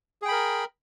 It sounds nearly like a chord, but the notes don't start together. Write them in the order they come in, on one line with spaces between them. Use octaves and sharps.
G#4 G5 B5 A#4